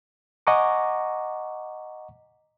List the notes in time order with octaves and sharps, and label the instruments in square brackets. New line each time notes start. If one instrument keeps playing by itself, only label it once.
[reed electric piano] D#5 F#5 G#5 A#5 C#6 D6